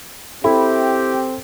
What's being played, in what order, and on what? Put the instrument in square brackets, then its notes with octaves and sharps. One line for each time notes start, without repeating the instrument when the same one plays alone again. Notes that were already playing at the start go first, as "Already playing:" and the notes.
[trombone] C4 [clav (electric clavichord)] E4 [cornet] G4 [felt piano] A4